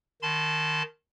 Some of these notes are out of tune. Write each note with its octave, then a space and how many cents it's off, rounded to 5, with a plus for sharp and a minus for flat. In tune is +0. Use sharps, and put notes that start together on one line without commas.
D#3 -10 A5 -15 C6 -35